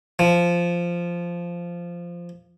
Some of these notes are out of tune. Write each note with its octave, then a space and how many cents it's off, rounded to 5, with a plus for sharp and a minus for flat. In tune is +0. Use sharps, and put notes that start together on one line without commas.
F3 -10